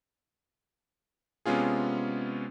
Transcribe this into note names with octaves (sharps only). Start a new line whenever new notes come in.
C3 G#3 B3 C#4 F4 G#4